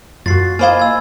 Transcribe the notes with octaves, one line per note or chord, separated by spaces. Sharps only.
F#2 F4 F#4 A6 C7
A#3 E4 C5 D#5 F5 G#5 B5 G#6
E6 G#6